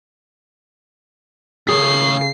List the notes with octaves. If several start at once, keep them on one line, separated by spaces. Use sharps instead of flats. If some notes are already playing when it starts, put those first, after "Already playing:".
D#2 A2 C#3 G#4 C7